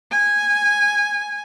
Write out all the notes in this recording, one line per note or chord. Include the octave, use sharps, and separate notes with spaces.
G#5